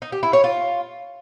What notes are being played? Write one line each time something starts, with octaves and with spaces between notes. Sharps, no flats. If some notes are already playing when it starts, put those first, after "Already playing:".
D#4
G4
E4
C#5
F4